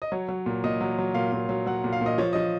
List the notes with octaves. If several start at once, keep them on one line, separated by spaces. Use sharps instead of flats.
D#5
F#3 C#5
F#3
A#2
A#2 D#5
F#3
F#3
A#2 F5
A#2
F#3
F#3 F#5
A#2
F5
A#2 D#5
F3 C#5
F3 D#5